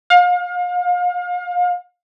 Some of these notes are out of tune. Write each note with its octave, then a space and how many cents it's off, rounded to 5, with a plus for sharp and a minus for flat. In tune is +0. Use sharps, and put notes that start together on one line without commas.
F5 +35